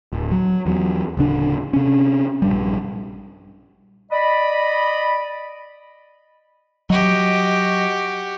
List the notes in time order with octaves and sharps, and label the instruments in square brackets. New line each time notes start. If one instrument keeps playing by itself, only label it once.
[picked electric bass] D1
F#3
E2 F#3
D1 C#3 D4
C3 C#4
A#1 G2 G3
[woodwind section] D5 D#5 B5
[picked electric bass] F#3 [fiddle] F#4 G4 [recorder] D#5